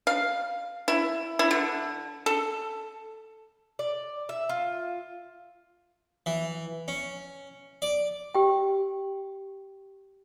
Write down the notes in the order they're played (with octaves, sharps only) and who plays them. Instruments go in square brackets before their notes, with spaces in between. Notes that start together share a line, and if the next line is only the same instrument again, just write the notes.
[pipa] F5
E4
E4
D3
A4
[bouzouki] D5
E5
F4
[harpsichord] E3
C#4
D5
[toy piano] G4 G5